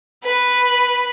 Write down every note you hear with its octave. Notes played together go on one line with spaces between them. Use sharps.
B4